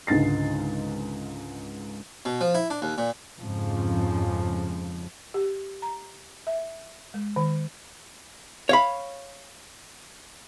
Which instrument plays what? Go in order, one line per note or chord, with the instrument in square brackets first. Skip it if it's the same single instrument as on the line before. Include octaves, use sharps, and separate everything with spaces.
[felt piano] C#2 G#2 D3 A6 C7
[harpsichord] B2
F3
E4
D4
D#2
A#2
[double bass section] F2 G#2 C#3 F3
[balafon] G4
A#5
E5
G#3
D#3
[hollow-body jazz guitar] C#5 F5 B5